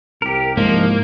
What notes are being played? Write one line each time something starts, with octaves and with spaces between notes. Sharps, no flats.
C2 G4 A#4
G#2 F3 A#3 D#4